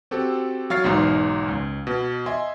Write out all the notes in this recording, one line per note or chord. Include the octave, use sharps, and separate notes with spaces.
C4 F#4 G4 A4
F#3 F5 C#6 F6 A6 C7
B1 E2 G#2 D#4 C6
C#2
B2
D#5 E5 G#5 C6